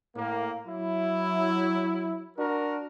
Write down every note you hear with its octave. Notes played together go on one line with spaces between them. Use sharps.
A2 A#3
F#3 E4
D4 F#4 A#4